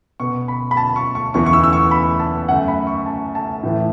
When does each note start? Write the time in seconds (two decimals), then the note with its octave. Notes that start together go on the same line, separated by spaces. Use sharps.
0.20 B2 B3 C#6
0.48 B5
0.71 B5
0.77 A5
0.96 C#6
1.15 C#6
1.34 E2 E3 B3 C#6
1.46 C#6
1.53 E6
1.64 E6
1.73 C#6
1.91 B5
2.20 A5
2.48 F#2 C#3 A3 F#5
2.68 B5
2.87 C#6
3.06 A5
3.35 A5
3.63 A2 E3 A3